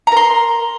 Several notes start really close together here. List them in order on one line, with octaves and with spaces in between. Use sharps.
A#5 A#4 C6